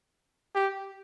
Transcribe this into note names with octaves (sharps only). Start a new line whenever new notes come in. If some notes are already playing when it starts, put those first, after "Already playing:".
G4